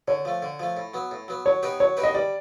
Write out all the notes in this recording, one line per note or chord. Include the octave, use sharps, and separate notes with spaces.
D3 C#5
F3 A3
D3
F3 A3
A2
F#3 B3
A2
F#3 B3
F#3 C#5
B3 D#4 G4 B4
F#3 C#5
B3 D#4 G4 B4
D#5
G3 D5